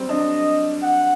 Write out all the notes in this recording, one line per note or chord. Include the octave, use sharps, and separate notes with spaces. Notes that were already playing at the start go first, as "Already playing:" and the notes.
Already playing: F#3 G3 C4
D4 D#5
F#5